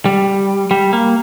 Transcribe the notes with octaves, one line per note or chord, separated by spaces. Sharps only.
G3
G3
A#3